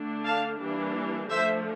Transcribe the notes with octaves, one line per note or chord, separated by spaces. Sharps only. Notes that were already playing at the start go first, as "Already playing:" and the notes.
Already playing: D3 A3 D4
F5 A5
E3 G3 A#3 D4
D3 F3 A3 C5 E5